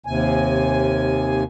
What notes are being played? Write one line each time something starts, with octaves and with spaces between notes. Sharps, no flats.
D#2 C3 G#5